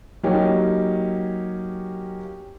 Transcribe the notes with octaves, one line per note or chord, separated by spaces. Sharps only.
F#3 A#3 C#4 D#4 G4